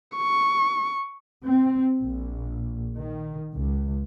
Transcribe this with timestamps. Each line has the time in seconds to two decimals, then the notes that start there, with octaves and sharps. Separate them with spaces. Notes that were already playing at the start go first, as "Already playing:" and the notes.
0.16 C#6
1.43 C4
2.01 A#1
2.97 D#3
3.55 C#2